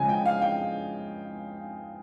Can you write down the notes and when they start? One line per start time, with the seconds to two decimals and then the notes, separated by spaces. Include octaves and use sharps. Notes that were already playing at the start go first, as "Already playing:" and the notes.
Already playing: C#3 F3 G#3 G#5
0.09 G5
0.26 F5
0.42 G5